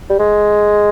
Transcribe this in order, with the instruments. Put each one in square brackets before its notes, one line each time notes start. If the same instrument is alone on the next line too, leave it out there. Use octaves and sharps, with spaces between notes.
[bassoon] G3
G#3